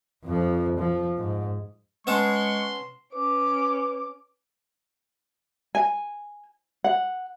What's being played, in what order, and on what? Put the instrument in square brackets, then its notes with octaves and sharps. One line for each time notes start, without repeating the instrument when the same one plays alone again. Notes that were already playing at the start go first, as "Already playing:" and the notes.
[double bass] F2 F3
F3
G#2
[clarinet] G#3 [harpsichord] B3 C#4 A5 [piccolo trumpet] C6 [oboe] C#6
[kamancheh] C#4 D6 [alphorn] B4
[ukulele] G#5
F#5